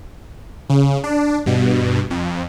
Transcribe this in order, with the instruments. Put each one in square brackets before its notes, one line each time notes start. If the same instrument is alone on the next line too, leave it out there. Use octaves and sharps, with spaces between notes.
[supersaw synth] C#3
D4
G2 B2
F2